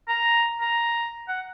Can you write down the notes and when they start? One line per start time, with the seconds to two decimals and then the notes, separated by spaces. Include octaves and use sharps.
0.09 A#5
0.61 A#5
1.28 F#5